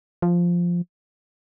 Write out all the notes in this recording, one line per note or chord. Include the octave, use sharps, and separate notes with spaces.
F3